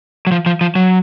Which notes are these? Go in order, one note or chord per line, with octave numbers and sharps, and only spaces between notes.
F#3
F3
F3
F3
F#3